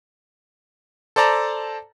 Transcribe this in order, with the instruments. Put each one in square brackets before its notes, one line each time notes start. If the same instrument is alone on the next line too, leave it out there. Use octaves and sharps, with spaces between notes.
[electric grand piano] A4 C5 D5 A5 A#5